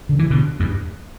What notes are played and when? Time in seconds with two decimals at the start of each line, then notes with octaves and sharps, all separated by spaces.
0.09 D3
0.19 E3
0.30 B2 D3
0.60 E2 G2